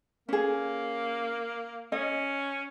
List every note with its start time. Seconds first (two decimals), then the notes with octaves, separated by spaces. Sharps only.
0.29 A#3 C#4 G#4
1.92 C#4 D#5